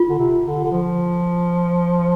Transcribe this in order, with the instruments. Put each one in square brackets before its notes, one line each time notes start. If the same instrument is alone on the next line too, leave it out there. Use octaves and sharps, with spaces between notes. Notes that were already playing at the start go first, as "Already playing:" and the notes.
Already playing: [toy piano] F4
[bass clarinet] D3
C3
D3
D3
F3